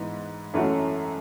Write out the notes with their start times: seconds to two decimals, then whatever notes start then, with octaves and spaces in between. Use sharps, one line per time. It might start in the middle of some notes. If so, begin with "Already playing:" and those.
Already playing: G#2 E3 B3
0.54 F#2 E3 A3 C#4 F#4